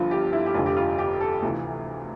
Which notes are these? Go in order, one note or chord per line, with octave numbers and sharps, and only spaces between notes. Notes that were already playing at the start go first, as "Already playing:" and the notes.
Already playing: G1 G2 D3 F3 F4
G4
E4
G4
F1 F2 D3 F4
G4
F4
G4
A4
D2 C3 E3 F4